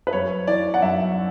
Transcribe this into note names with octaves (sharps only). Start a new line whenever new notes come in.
B4
F#2 C#5
E3 D5
F#5
F#2 E5